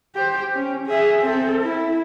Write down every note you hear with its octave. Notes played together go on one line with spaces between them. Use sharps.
G4 C5
C#4
G#4 E5
C4 A4
E4